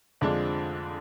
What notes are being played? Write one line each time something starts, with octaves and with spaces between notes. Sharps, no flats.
F2 D3 G#3 D4 F4